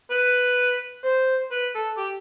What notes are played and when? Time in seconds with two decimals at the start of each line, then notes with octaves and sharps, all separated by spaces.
0.10 B4
1.03 C5
1.51 B4
1.74 A4
1.97 G4